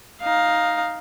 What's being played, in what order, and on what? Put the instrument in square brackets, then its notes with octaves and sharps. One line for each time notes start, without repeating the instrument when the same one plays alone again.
[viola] D#4 F5